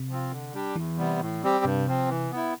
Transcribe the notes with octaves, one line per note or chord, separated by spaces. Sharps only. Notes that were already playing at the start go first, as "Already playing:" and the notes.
Already playing: C3
F3 C4 F4
D3
G3 D4 G4
E2 E3
C3 G3 B3
A2
G3 C4 G4
G2 C3
F3 C4
E3
B3 E4